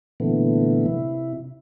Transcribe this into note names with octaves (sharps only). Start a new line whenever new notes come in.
A#2 D3 E3 A3 B3
C3 E4